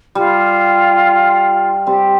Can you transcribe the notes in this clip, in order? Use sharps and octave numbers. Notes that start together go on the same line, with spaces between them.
G3 F4
G3 C4 G4